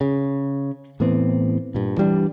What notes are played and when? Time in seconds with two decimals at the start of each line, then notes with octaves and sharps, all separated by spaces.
0.01 C#3
1.00 A2 E3 B3 C4
1.74 G2 A#2
1.97 E3 G3 D4